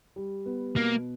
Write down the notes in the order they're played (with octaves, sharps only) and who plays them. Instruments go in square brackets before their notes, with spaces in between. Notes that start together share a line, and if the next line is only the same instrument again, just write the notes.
[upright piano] G3
B3
[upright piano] B2 [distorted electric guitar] A#3